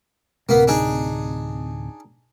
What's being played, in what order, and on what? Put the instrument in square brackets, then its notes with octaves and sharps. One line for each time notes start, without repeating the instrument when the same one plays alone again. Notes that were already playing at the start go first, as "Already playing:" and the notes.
[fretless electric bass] D1 C3 [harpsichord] A#3 B3
[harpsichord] D4 D#4 G#4